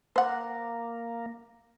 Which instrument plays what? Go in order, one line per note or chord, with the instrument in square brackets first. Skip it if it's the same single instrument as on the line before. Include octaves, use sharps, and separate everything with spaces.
[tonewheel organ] A#3 [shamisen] C5 F#5